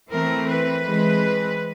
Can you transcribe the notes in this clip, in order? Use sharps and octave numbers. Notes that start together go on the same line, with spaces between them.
E3 A3 C4 A#4
B4
E3 G#3 C4